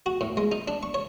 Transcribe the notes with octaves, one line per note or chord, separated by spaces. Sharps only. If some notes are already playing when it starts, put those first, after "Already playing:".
F#4
A2
G#3
D#4
D4
C#6
C#5